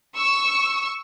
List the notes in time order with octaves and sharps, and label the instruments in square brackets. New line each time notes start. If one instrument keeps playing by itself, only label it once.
[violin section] C#6 E6